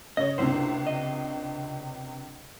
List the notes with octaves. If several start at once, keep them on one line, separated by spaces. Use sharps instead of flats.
C#3 C#5 D#5
C#2 C3 A#3 D4 E4 C5
D#5